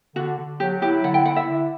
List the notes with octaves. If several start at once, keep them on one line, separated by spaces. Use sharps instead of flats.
D3 F#4
D3
F#3 G4
E4 G4
D3 F#5
G5
E4 F#5
E5
D3